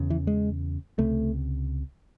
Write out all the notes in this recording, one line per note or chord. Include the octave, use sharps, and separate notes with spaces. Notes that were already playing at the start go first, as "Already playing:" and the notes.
Already playing: E2 C#3
E3
G#3
C#2 C3 A3